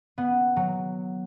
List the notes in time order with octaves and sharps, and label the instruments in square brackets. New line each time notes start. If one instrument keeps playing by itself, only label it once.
[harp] B3
F#3